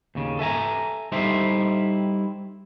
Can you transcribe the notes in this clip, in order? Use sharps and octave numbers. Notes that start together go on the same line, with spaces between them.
D#2 C#3
A4 E5 G#5 A#5
G3 D#4 E4 A4 C5 E5